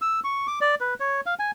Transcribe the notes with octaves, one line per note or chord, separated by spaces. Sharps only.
E6
C#6
D6
D5
B4
C#5
F5
G#5